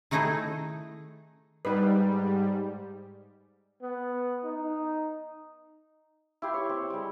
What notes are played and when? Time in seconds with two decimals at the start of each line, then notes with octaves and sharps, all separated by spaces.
0.11 D#3 A3 D#4 E4 G#4 A4
1.65 G#2 G3 D#4 B4
3.82 B3
4.44 D#4
6.42 E4 G4 C6
6.54 C#5
6.69 C4
6.90 G3 G#3